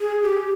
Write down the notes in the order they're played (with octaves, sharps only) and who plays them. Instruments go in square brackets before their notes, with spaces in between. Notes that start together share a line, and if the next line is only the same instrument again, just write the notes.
[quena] G#4
G4